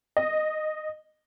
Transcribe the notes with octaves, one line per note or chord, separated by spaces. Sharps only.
D#5